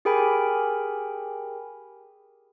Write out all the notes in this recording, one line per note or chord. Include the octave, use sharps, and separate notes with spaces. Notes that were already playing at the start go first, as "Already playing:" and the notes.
G4 G#4 A#4 G5 G#5 B5